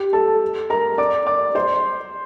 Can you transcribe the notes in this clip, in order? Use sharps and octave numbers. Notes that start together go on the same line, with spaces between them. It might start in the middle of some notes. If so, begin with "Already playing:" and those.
Already playing: G4
A4 A5
A#4 A#5
D5 D6
D5 D6
C5 C6